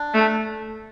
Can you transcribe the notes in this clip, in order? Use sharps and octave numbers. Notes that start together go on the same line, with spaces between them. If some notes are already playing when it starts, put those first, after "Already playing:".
Already playing: D4
A3